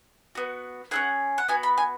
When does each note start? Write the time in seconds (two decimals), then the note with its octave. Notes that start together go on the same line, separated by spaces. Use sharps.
0.35 B3 F#4
0.91 C#4 E4 G#4 F#5
1.38 F#5
1.48 B3 F#4 G#5
1.63 B5
1.78 G#5